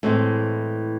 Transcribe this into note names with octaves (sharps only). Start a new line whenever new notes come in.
A2 E3 G#3 C4